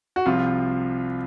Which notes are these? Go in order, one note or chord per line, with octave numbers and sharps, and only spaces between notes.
F#4
C2 C3 F3 F4